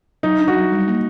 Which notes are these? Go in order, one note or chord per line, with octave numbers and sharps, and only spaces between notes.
F#3 D#4
D4
F#4
F#3
G3
A#3